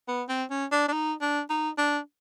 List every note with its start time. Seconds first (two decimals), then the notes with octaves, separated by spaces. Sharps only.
0.08 B3
0.29 C4
0.51 C#4
0.72 D4
0.88 D4
0.93 D#4
1.21 D4
1.50 D#4
1.78 D4